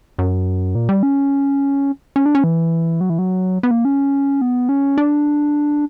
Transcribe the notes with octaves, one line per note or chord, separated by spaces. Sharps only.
F#2
A#2
G3
C#4
C#4
D4
C#4
E3
F#3
E3
F#3
B3
A#3
C#4
B3
C#4
D4